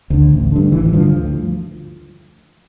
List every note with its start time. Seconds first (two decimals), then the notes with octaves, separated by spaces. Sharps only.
0.10 D2 D3
0.31 A1
0.52 G2 D3
0.72 A1 E3
0.85 E3
0.93 G2 D3 F3
1.13 D2